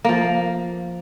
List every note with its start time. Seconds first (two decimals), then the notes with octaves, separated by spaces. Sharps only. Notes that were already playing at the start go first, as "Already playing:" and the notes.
0.04 F3 A#3